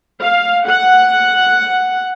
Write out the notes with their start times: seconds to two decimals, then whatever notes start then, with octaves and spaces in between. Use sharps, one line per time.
0.23 F5
0.67 F#5